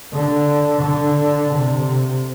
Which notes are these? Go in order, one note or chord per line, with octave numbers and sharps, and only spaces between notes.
D3
D3
C3